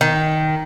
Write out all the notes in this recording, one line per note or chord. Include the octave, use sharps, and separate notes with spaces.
D#3